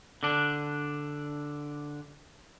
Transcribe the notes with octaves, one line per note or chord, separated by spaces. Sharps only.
D3 D4